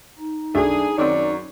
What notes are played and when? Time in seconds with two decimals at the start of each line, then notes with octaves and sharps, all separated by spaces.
0.19 D#4
0.55 B1 F#2 A3 D4 G#4
0.98 F#2 D#3 C4 C#4 C#5 D5